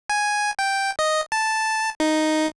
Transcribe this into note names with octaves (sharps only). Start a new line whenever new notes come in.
G#5
G5
D#5
A5
D#4